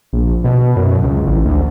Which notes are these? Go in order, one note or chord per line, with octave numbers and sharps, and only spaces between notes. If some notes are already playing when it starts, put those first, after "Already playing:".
A#1
B2
F#2
C#2
A1
D2